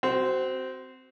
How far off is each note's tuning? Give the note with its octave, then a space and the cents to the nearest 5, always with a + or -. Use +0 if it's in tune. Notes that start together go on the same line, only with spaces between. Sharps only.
C4 -10 F#4 +25